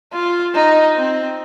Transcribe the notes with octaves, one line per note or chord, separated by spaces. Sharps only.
F4
D#4
C4